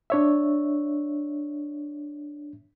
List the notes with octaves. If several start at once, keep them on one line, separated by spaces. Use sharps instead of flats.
D4 C#5 E5